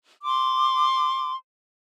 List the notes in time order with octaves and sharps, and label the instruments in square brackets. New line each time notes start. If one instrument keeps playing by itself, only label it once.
[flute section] C6 D6